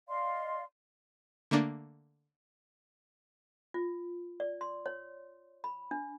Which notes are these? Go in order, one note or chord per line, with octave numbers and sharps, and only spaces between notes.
D5 D#5 F5 C6
D3 A3 A#3 D4
F4
D5
C6
C#5
B5
D4